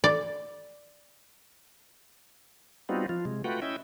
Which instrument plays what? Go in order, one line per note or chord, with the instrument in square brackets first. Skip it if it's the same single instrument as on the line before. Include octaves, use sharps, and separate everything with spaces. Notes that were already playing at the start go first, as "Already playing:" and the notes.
[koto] D5
[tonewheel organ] G3 B3 C4 D#4 F4 F#4
F3 F4
C3 G#3
A3 F4 F#4 B4 F#5 G5
C#4 E4 D#5 E5 G5